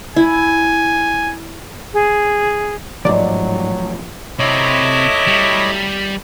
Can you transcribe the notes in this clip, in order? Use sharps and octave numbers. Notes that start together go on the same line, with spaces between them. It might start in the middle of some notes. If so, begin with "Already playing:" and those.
E4 G#5
G#4
A1 D2 G#2 F3 F#3 A3 D5
C3 F#3 A3 C4 E4 C#5 D#5 D6
G3